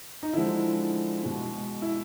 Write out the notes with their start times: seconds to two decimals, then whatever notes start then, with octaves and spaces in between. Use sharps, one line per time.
0.23 D#4
0.33 D3 F3 G#3 E4
1.23 B2 G#3
1.82 E4